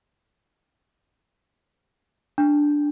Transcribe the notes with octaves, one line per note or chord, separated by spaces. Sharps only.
D4